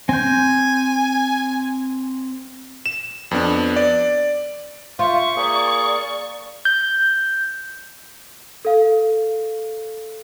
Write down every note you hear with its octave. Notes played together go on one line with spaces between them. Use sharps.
C4 G#5 G6
E7
F2 B3 D4
D5
F4 C5 E5 C#6
A#3 G#4 D5
G6
A4 F5